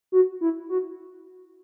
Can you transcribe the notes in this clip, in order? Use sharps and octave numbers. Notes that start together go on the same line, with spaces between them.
F#4
E4
F#4